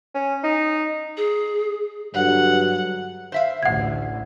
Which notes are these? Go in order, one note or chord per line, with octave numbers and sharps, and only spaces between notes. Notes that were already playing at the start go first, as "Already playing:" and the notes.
C#4
D#4
G#4
G2 D3 F#3 F#5
C5 E5 F5
A1 D2 F#5 G#6